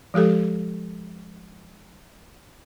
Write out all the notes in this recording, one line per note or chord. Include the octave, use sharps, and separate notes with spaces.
F3 G#3 G4 A4